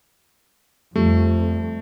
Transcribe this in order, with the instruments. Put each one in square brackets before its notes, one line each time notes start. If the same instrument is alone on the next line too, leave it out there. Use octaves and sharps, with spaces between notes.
[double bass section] F2 [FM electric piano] F3 G3 [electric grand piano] A3